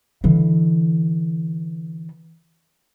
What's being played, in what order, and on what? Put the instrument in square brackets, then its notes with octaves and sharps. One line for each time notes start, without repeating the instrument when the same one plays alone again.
[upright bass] D3 E3